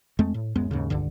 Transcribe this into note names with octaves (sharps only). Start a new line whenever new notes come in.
F2 G#3 A3 C4
A2
D1 F#2 G#3 B3
D#2 G#2 C#3
D#1 C#2 G2 D3